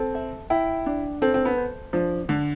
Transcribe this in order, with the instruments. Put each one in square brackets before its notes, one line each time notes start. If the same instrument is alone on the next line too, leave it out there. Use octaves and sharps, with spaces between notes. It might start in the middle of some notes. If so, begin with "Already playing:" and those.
Already playing: [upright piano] C4 [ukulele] A4
[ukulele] E5
[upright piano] E4 [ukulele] G5
[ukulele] D4
[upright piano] C4 [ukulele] A4
[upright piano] C4
B3
[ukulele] C5
[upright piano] F3 [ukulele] D4
[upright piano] D3 [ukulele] D4